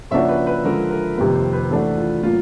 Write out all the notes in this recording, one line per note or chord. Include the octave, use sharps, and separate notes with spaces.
C#3 F3 A#3 D4 F#4 E5
B4
B4
D3 F3 G#3 A#4
A#4
F2 C3 D#3 G3 A#3 B4
C5
B4
E3 A3 D4 F#4 A4
F4
A2 F#3 A#3 F4